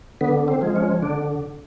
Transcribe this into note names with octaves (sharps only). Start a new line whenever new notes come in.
D3 B3
C4
F3 G#3
C#4
D3 D4